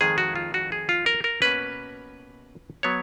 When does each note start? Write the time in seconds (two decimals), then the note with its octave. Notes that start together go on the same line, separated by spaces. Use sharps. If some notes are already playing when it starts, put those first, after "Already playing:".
0.01 F2 D#3 G#3 G#4
0.18 F#4
0.36 F4
0.54 F#4
0.72 G#4
0.89 F4
1.06 A#4
1.24 A#4
1.42 B2 A#3 C#4 B4
2.83 F#3 B3 C#5